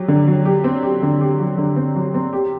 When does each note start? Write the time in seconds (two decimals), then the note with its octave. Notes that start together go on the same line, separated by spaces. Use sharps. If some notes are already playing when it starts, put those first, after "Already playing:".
Already playing: F#3 G4
0.08 D3
0.28 F#3
0.45 G4
0.64 C4
0.83 G4
1.02 D3
1.21 G4
1.39 F#3
1.58 D3
1.76 C4
1.96 F#3
2.14 C4
2.33 G4